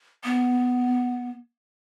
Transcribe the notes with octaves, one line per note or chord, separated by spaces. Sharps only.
B3